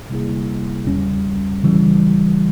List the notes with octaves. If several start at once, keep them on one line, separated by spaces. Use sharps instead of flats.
C3 G3 A#3 E4 G#4
E2 C#3 G3 C#4
C#3 E3 G3